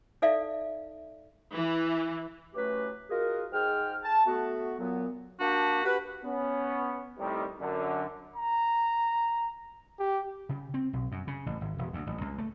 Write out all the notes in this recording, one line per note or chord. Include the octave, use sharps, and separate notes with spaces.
D#4 A4 D5 E5 F5
E3
E3 F#3 A3 C#4 G4 B4
D#4 F4 F#4 G#4 A#4
G#2 G#4 G5 F6
A5
A3 B3 F#4
A#2 F#3 B3
A#3 D4 F#4 G4 A5
F#4 G4 B4
B3 C#4
A2 C3 D#3 G3
F#2 D3
A#5
G4
C#3
C4
B1
F#2
C#3
A1
G#1
E1
D2
A1
C#2
A3